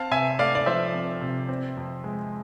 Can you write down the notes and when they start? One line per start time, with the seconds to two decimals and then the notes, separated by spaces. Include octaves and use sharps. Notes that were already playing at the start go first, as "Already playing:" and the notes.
Already playing: C4 F5 A5
0.11 C3 E5 G#5
0.39 A3 D5 F5
0.55 D5
0.66 F3 C5 E5
0.94 C4
1.21 C3
1.49 C4
1.77 F2
2.04 G#3